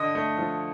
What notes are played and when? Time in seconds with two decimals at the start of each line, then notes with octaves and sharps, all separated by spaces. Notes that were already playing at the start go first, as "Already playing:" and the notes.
Already playing: D3 D#5 D#6
0.15 A3
0.38 F3